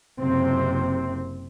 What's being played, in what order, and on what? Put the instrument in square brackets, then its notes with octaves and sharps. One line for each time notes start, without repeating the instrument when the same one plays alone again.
[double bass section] F#1 C3 C4